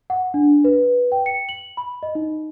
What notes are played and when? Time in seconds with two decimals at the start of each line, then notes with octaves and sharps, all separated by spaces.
0.10 F#5
0.34 D4
0.64 B4
1.12 G5
1.26 C#7
1.49 F#7
1.77 B5
2.03 D#5
2.15 D#4